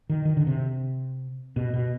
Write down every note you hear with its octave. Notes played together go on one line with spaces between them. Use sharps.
D#3
D#3
D3
C3
B2
B2